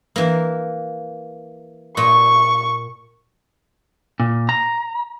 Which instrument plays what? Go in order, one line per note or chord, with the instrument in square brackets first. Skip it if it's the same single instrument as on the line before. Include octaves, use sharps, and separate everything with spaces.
[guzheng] E3 A#3
[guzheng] A#2 [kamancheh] C#6
[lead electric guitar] A#2
A#5